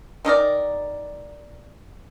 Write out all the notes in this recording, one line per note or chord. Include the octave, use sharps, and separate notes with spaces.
D#3 D#4 A#4 D5